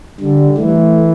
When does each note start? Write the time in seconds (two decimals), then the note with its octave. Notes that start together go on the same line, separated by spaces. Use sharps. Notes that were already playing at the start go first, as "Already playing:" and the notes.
0.20 D3 G3
0.58 E3 A3